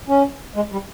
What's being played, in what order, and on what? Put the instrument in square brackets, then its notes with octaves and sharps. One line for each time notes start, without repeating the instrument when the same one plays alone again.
[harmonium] C#4
G#3
G3